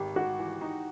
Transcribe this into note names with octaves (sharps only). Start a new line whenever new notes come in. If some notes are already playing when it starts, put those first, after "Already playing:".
Already playing: G#1 G4
G#1 F#4
E3
D#4